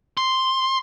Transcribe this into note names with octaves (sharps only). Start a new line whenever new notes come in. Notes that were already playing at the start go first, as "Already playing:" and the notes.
C6